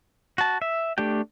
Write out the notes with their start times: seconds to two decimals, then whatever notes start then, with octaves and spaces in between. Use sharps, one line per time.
0.38 F#4 A5
0.62 E5
0.98 A3 D4 G4 G5